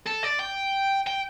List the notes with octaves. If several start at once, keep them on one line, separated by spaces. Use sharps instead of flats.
A4
D5
G5
G5